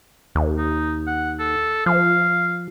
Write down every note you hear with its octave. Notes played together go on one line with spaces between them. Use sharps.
D#2
D#4
F#5
A4
F3 F5